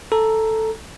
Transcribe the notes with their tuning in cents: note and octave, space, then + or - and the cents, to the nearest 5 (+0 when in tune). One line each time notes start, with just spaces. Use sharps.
A4 +0 A#5 +0